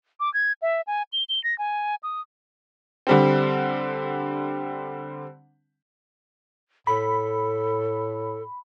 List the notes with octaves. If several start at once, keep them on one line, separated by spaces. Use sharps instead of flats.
D6
G#6
E5
G#5
G7
G7
A#6
G#5
D#6
D3 G3 C4
A2 A4 B5